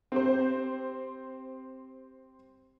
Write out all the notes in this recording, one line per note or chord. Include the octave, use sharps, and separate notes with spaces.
C4 G4 C5